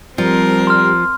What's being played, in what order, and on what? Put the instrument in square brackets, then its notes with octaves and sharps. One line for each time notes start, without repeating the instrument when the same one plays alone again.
[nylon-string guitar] F3 [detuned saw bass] G3 [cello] C4 A#4
[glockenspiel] C6 F6